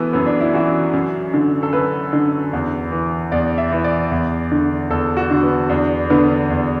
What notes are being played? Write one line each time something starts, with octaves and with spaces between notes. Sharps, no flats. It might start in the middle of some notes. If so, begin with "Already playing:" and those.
Already playing: E3 B3 F#4 A4
F#2 B3
D4
E4
E3 F#4
F#2
D3
A4
F#2 B4
D3
E2
E3
E2 D5
E5
E3
D5
E2
D3
E2 A4
F#4
D3
B3
E2 D4
D3 B3
E2